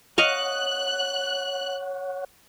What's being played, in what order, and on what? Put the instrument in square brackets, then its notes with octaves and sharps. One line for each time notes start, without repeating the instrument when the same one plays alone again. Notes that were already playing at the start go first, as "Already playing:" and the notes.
[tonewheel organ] C#5 F#5 [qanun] D#5 F5 C#6 [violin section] F#6